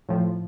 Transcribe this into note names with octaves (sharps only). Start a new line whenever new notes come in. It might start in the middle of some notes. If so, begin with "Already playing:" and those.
A2 F3